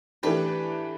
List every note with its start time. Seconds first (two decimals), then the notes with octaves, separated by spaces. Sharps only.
0.23 E3 A3 D4 G4 B4